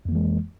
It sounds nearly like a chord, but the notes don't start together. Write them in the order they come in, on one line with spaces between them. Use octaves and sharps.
F2 A#3 E3 G#3